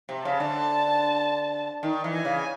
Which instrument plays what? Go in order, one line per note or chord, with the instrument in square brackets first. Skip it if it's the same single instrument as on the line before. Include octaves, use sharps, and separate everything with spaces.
[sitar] C3
[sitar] C#3 [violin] A5
[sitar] D3
D#3
E3
[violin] G#5
[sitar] C#3